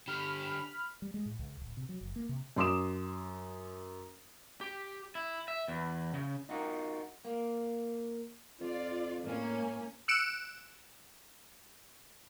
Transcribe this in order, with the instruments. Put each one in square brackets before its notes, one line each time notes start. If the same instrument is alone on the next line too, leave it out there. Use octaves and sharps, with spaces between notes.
[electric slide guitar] D3 G4 [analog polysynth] B5 F6
[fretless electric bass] G3
G#3
A2
C#2
D1
C3
F#3
F#1
A#3
C3
[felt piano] F#2 C6 D6 D#6 E7
[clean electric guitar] G4
E4
E5
E2
C#3
D#4 F4 F#4 A#4
A#3
[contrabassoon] F2 [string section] F4 D5
[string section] A2 A#3 C#4
[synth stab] E6 F#6 C#7 D7 E7